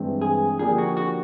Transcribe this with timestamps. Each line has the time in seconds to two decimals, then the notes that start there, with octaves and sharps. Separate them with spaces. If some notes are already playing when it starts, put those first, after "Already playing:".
Already playing: G2 E3 G#3 C4
0.22 G#4
0.59 D3 F3 A#3 D4 G4 G#4
0.78 F#4
0.97 F#4